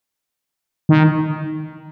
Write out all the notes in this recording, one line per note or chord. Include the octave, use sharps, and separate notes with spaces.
D#3